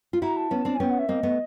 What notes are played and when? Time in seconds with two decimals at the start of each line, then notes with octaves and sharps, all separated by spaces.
0.13 F4
0.22 E4 F#4 A#5
0.37 A5
0.51 B3 C#4
0.65 C4 D4
0.75 G#5
0.80 B3 C#4 G5
0.90 F#5
0.99 E5
1.09 A#3 C4 D#5
1.23 A3 B3